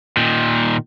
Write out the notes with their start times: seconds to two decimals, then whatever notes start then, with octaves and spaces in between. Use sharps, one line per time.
0.17 A#2 D#3